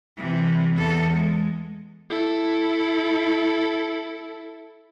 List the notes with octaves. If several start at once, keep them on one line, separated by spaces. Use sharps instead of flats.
C3 E3
E2 A4
G#3
E4 A4